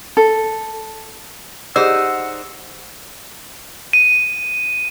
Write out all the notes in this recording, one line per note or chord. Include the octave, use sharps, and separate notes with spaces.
A4
D#4 G4 G#4 C5 D5 F#5 E6
D#7